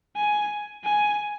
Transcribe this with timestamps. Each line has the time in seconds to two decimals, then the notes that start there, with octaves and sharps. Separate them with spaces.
0.16 G#5
0.84 G#5